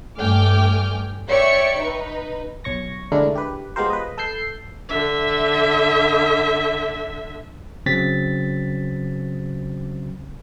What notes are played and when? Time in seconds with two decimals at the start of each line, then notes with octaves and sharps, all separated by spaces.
0.19 G2 A3 G5 G#5 D6 F6
1.29 C#5 D5 E5 G5 C#6 C#7
1.79 D#4 B4
2.64 B1 C#5 C#6 A#6
3.12 D3 G#3 A3 D4 E4 A#4
3.35 G4 B4
3.76 G#3 B3 F4 G4 A#4 C5
3.90 B4 D#5
4.18 A4 E6 G6 C7
4.89 D3 E5
7.86 C#3 F#3 C4 A6 B6